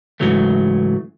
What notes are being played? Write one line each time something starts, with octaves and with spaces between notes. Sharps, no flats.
G#2 C#3 E3 F#3 A3